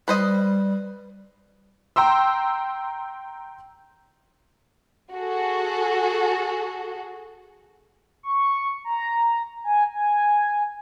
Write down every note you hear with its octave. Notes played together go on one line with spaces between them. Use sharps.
G3 B4 C5 D#5
G5 A#5 C6 E6
F#4 G#4 A4
C#6
A#5
G#5
G#5